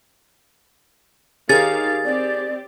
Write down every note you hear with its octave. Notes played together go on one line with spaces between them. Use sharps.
D#3 G4 G#4 A#4 C#5 F5 A6
C4 G4 D5